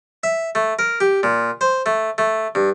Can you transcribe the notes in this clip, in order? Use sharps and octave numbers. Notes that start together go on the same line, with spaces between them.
E5
A3
A#4
G4
A#2
C5
A3
A3
G2